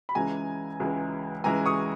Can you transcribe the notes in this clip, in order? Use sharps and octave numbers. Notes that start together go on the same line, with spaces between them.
B5
C#2 C#3 E3 G#3 G#5 A#5
C#2 C#3 E3 G#3
C#2 C#3 E3 G#3 G#5 A#5
C#6 D#6